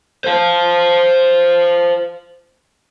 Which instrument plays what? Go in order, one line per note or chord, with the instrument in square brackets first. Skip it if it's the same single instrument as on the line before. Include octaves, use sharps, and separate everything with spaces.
[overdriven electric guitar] C5 F5